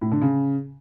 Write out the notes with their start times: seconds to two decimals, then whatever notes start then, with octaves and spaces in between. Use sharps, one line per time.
0.01 A2
0.12 D3
0.22 C#3